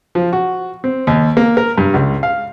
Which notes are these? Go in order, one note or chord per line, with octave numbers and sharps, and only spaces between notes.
F3
F#4
C4
D#2
A#3
A#4
G2
C#2
F5